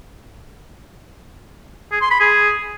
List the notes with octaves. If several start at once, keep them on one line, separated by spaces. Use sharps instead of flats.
G#4
C6
B5
G#4